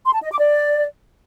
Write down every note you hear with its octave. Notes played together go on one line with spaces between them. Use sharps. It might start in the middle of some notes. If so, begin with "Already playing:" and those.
C6
A5
D#5
D6
D5